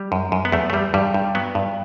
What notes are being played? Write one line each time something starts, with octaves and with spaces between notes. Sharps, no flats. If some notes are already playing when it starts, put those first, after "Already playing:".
Already playing: G3
F#2
F#2
B3
E2 A3
A3
E2 G3
G2 G3
G2
F#3 B3
G2